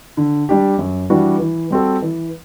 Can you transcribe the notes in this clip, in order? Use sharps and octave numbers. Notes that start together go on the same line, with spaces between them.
D3
G3 D4 G4
F#2
E3 G3 D4 F#4
E3
G3 C4 F#4 A4
E3